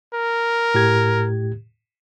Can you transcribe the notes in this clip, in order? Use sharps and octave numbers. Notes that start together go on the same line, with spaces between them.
A#4
A2 G4 G#6